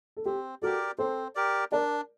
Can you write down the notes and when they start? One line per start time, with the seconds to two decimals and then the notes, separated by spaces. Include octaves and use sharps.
0.17 A4
0.26 C4 G4
0.62 F#4 G4 A4 A#4 D5
0.98 C4 A4 C5
1.35 G4 A#4 D5
1.72 D4 A#4 D5